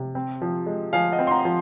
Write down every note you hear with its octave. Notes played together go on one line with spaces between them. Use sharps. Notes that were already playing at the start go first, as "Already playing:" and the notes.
Already playing: C3
C4
F3
G#3
F3 F5 G#5
D#5 F#5
C4
C6
F#5 A#5
F3